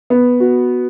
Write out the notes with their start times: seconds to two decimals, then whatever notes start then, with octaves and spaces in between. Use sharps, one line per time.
0.10 B3
0.40 F#4